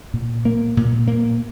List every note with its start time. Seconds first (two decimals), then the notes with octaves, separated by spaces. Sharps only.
0.14 A#2
0.45 A#3
0.77 A#2
1.08 A#3